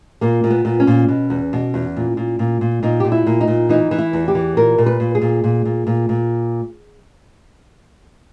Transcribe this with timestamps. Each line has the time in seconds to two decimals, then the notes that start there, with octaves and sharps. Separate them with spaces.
0.21 A#2 A#3
0.44 A#2
0.50 B3
0.65 A#2
0.80 C#4
0.87 A#2
1.08 B2
1.30 E2
1.53 B2
1.74 E2
1.96 A#2
2.17 A#2
2.39 A#2
2.61 A#2
2.83 A#2 D#4
3.00 A#2 G4
3.12 E4
3.26 A#2
3.41 D#4
3.47 A#2
3.69 E3 D#4
3.91 E3
3.98 E4
4.13 E2
4.28 G4
4.35 E3
4.57 A#2 A#4
4.78 A#2
4.86 B4
5.00 A#2
5.15 G#4
5.22 A#2
5.44 A#2
5.65 A#2
5.87 A#2
6.09 A#2